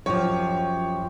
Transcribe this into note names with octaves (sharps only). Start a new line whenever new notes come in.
F#2 F3 G4 C#5